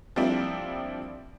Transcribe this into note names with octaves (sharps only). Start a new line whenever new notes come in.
F3 G3 A#3 C4 D4 E4